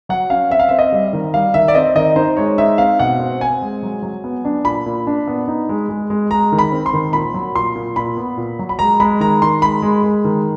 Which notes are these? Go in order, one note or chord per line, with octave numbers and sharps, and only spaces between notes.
F#3 F#5
C#4 F5
C4 E5
F5
C4 E5
D#5
G3
D#3
G3 F5
D#3 E5
D5
C4 D#5
D#3 D#5
D#4 C5
G#3 C#5
D#4 E5
C4 F5
B2 F#5
C4
C4 G#5
G#3
F#3
F#3
B3
D4
A#2 B5
A#2
D4
B3
D#4
G#3
G#3
G#3
G#3 A#5
D#3
B5
C4
C6
D#3
A#2 B5
F#3
A#2 C6
A#2
A#2 B5
B3
A#2
F#3
B5
G#3 A#5
G#3 B5
D#3 A#5
D#3 C6
G#3 B5
G#3
G#3
D#3